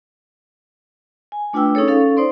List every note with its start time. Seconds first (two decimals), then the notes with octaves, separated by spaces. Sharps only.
1.32 G#5
1.53 A3 D4 F4 B4 G5 E6
1.75 C#4 D#4 G#4 A4 C#5
1.88 C#4 A4 F5
2.17 D#4 C5 D5 C6